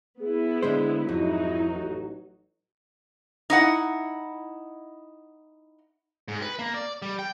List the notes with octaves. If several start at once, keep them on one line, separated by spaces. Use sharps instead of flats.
B3 E4 G#4
D3 G#3 C5
F2 G#2 F3 F#3 D#4 E4 F#4
A1
D#4 E4 F#5
G#2
B4
A#3
D5
G3
G5